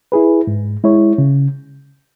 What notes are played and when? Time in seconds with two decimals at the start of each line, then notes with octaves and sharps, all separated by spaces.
0.12 E4 G#4 B4
0.47 G#2
0.84 G#3 E4 C#5
1.18 C#3